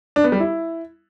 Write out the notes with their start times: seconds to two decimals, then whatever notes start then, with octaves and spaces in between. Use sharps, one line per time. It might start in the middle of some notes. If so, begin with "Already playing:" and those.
0.16 D4
0.24 B3
0.32 G3
0.40 E4